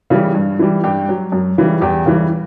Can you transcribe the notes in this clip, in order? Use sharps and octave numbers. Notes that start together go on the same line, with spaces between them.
C#3 E3 G3
G2
E3 G3
G2 G4
F#3
F#2
C#3 E3 G3
E2 G4
C#3 E3 G3